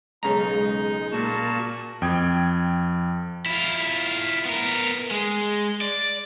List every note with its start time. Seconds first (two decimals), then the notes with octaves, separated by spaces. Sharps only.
0.23 B1 C#3 G#3 D#4 A#5
1.12 A#2 A#3 F#4 A5
2.02 F2 G5 D#6 G#6
3.46 E4 F4
4.45 B3 A#4
5.11 G#3
5.81 D5